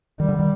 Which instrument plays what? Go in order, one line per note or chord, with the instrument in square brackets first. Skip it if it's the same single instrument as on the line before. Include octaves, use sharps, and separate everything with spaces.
[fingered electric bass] D#3 [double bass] G3
[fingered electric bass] D3
D#3